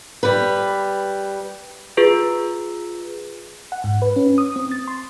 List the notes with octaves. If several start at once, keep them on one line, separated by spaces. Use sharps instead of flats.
G3 B4
F4 G#4 B4
F#5
G#2
B4
C#4
D#6
C4
A6
C6